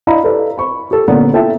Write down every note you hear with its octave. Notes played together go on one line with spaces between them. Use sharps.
D4 E4 D#5 F5 A#5 B5
G4 A4 B4 D5
B5 C#6
G4 A4
A#2 D3 A#3 B3 C#4
E4 F4 A4 E5 G5 A5